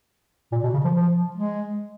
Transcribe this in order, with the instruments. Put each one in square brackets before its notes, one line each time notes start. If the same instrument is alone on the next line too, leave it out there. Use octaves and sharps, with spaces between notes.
[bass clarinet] A#2
B2
C#3
F3
F3
G#3